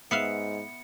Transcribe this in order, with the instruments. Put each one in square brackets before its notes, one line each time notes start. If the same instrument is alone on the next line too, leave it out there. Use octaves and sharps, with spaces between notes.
[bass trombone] G#2 [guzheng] B3 E5 F5 [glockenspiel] C#7